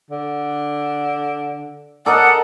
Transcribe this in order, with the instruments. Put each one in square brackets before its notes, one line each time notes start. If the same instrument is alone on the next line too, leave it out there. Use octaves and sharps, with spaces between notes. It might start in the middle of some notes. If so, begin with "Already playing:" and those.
[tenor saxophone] D3
[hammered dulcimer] A4 A#4 D#5 [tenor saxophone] D5 [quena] F#5